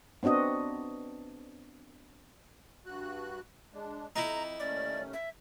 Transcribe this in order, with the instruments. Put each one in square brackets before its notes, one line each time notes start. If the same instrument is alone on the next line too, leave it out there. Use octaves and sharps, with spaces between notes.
[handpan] B3 C4 D4 F#4 D#5
[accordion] G2 F#4 F#6
G#3 D4
[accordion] F2 [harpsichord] D#4 E4 [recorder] A#5
[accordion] D#2 A3 C#4 [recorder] D5
[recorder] E5